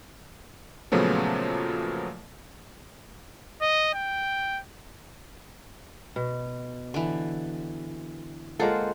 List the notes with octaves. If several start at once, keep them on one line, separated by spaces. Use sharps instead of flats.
A#2 C#3 F3 F#3 A3 B3
D#5
G5
B2
D3 E3
G#3 A#3 F4 A4 C5 F#5